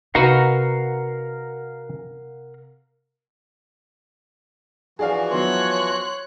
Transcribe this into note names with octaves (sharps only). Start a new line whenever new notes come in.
C3 D#4 F#4 A#4 B4 F5 F#5
E3 F3 F#4 G#4 D5 F5
F#3 B3 C#5 C6 F#6